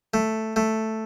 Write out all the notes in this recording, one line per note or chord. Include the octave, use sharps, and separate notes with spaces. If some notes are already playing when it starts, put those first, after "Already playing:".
A3
A3